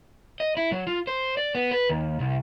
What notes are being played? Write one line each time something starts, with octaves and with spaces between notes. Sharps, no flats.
D#5
E4
F#3
F4
C5
D5
B3
B4
D#2
C2